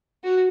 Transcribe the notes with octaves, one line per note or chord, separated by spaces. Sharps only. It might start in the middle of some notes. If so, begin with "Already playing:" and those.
F#4